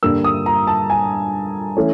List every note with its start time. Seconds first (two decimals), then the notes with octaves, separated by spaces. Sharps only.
0.03 G2 D3 G3 A#3 E6
0.24 D#6
0.46 A#5
0.67 A5
0.90 G#5
1.77 E3 A3 C#4